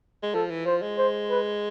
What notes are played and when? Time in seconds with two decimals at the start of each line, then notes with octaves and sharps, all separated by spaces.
0.23 G#3
0.34 F3 A4
0.50 E3
0.66 F3 C5
0.82 G#3
0.98 C5
1.30 B4